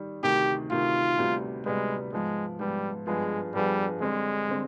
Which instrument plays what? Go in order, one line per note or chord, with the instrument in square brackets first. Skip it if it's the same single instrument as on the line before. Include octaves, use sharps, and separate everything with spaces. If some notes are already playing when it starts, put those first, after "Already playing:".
Already playing: [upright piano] D#3 G3
[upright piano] D2 C3 D#3 [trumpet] G4
[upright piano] D2 C3 D#3 [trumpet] F4
[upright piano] D2 C3 G3 B3
[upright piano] D2 C3 G3 B3 [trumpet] G#3
[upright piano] G#2 F3 B3 [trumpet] G#3
[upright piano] G#2 F3 B3 [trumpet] G3
[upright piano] G2 F3 B3 F4 G#4 [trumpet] G#3
[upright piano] G2 F3 B3 F4 G#4 [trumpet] G3
[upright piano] D3 G3 C4 [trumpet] G#3
[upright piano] D3 G3 C4